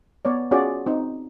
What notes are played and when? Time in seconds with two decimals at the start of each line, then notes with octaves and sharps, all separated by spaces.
0.25 B3 C#5 D5
0.51 C#4 F4 F#4 G#4 C#5 D5
0.86 C4 D#4